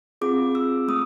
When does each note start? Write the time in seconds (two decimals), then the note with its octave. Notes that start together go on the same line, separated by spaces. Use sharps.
0.21 C4 F4 G#4 D6
0.55 E6
0.88 A3 D#6